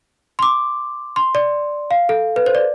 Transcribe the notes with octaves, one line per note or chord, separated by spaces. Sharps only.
C6
D6
C6
D5
F5
A4
B4
C5
D5